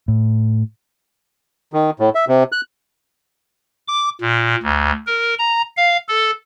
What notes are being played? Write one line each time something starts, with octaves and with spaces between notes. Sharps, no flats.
A2
D#3
A2
E5
C3
F#6
D6
A#2
D2
A#4
A#5
F5
A4